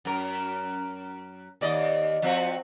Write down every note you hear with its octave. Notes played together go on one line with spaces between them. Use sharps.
F#2 A#4
D#2 D5 D#5
F3 C4 F#4